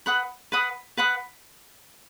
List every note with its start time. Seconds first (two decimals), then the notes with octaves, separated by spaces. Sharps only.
0.06 B4 F#5 B5 D#6
0.52 B4 F#5 B5 D#6
0.97 B4 F#5 B5 D#6